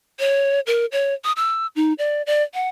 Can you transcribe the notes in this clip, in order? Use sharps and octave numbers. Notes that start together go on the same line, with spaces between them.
C#5
A#4
C#5
D#6
E6
D#4
D5
D5
F#5